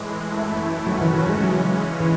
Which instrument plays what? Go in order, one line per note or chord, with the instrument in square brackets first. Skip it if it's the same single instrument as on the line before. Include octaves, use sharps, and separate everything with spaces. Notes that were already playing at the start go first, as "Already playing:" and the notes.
Already playing: [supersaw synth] A2 E3 G#3
F#2 E3 A3 E4
[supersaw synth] D#3 A3 C#4 F#4 [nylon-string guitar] F#3
[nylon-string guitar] E3
E3
F#3
G#3
[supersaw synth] C#3 E3 G#3 C#4 [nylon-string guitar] F#3
[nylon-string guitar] E3